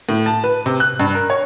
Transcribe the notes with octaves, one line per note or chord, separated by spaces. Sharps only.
A2
A5
B4
C3
F#6
G2
A#4
C#5